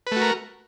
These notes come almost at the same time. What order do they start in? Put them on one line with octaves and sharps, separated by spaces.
B4 A3 F#4 A#4